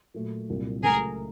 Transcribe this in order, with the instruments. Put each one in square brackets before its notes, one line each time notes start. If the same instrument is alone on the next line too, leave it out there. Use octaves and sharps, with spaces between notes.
[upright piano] A#2 F#3 A3
C2 A#2 F#3
[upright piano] C#2 C#3 F#3 A3 [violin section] G#4 A#4